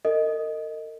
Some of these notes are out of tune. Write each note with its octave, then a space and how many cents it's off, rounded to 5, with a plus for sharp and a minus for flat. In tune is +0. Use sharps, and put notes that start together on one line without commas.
A#4 -40 D#5 +0